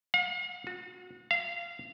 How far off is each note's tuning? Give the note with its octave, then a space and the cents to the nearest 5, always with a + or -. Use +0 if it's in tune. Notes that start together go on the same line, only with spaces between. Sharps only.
F5 +45
F#4 -35
F5 -20